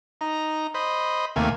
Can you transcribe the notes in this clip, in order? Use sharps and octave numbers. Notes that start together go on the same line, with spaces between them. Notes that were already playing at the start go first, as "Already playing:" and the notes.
D#4 A#5
C5 D#5 B5
D#2 C3 A3 A#3 G#5